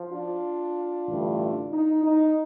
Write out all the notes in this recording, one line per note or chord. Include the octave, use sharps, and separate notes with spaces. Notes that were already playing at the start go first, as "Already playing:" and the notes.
Already playing: F3
D4 F4
A1 G2 D3 A3
D#4
D#4